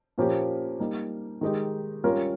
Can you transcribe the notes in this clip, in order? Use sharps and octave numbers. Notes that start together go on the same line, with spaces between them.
A#2 F3 A#3 C#4 G4
G3 A#3 D#4
D#3 G#3 D#4 G4
G3 C#4 F4 A#4